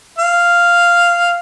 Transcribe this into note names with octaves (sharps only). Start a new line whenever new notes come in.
F5